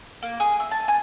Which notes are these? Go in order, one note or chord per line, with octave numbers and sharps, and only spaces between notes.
A#3
G#4
E5
A5
G#5